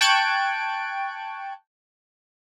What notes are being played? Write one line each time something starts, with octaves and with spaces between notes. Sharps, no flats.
G5 A5 C#6 F#6 G#6 D7